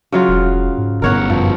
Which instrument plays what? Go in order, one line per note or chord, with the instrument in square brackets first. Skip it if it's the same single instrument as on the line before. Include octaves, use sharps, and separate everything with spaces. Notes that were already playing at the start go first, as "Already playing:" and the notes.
[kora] C#3 F#3 F4
[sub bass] E1
G#2
[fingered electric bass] G1 B2 [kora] A#4 C#5 F#5
[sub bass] F#2 [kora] F3